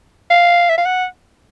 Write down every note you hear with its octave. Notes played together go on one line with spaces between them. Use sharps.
F5
E5
F5
F#5